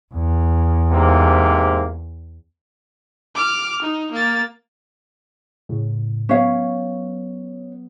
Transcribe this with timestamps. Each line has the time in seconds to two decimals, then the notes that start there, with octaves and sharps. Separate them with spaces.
0.14 E2
0.91 G#2 C3 A#3
3.35 D6 F6
3.82 D#4
4.12 A#3 A6
5.69 A2 C#3
6.29 F#3 B3 C#4 C#5 F5